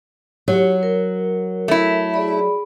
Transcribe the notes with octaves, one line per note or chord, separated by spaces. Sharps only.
F#3 G4 C#5
A#4
A3 E4
G#4 D5 B5